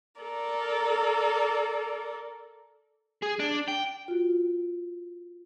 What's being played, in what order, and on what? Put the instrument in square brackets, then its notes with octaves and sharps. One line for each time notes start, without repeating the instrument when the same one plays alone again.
[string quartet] A4 A#4 D5
[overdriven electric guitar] G#4
D4
G5
[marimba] F4 F#4